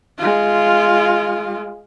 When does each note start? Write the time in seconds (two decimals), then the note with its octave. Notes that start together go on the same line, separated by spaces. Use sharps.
0.18 G#3 F4